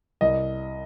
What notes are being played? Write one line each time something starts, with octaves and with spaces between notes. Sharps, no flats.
C2 D#5